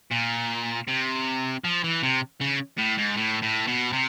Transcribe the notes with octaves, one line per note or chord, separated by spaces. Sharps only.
A#2
C3
F3
E3
C3
C#3
A2
G#2
A2
A2
B2
C3